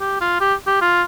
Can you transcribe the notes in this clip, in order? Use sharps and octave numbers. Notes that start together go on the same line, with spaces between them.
G4
F4
G4
G4
F4